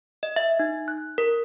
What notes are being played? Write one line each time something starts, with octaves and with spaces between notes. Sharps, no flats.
D#5
E5
D#4
F#6
A#4